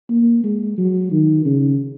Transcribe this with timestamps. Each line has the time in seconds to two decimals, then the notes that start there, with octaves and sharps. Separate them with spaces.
0.10 A#3
0.44 G#3
0.77 F#3
1.12 D#3
1.45 C#3